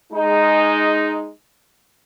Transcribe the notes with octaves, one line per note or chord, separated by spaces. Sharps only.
G#3 D#4